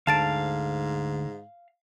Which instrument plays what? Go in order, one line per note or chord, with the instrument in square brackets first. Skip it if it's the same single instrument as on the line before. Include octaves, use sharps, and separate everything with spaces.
[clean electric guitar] D2 [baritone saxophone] G#2 [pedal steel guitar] F5 [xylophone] A5 A6 D7